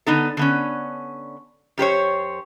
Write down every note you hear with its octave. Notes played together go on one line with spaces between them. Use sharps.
D3 B3 D#4 A4
D3 B3 C#4
F#2 G4 C5 C#5